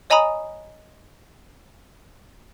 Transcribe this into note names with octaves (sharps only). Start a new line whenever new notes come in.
C#5 D#5 G#5 A#5 B5 D#6